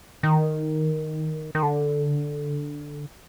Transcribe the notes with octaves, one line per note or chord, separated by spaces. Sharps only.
D#3
D#3
D3